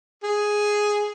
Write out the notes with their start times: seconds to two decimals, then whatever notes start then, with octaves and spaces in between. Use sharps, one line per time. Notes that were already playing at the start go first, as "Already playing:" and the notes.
0.24 G#4